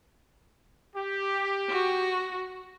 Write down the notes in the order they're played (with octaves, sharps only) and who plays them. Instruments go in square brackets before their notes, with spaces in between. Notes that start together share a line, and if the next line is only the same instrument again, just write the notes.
[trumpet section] G4
[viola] F#4